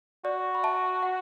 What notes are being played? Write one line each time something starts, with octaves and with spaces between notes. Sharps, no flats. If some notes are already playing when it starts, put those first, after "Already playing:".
F#4 D5
B5
E5 A5
F#5